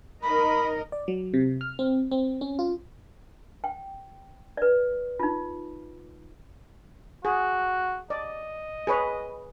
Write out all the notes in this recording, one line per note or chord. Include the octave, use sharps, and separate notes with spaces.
D#4 A#4 D#5 B5
D5
F#3
C3
F6
C4
C4
C#4
F4
G5
B4 D5
D#4 F4
F#4 G#4
D5 D#5
G#4 B4 C#5